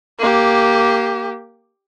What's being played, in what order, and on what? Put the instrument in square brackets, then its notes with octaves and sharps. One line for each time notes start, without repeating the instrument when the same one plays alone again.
[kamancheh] A#3 G4